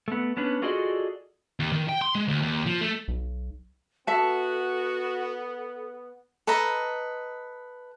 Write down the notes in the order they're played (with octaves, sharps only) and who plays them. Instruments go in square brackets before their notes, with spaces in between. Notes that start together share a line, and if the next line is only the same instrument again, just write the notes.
[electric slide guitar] A3 B3
B3 C#4 D4 B4
F4 F#4 G#4 A4 D5 D#5
[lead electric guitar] D#2
D#3
G5
C6
G#3
D2
D#2
F3
A3
[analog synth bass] B1
[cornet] B3 [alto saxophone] F#4 [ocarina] A4 [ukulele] E5 A5
[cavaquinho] A4 B4 D#5 A#5